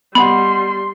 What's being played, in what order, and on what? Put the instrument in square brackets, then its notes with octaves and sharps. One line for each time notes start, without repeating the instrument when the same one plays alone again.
[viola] G3 C6 [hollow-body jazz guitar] B3 D#5 F#5 [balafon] B5